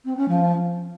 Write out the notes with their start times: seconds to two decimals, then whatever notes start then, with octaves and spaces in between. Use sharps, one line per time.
0.05 C4
0.16 C#4
0.28 F3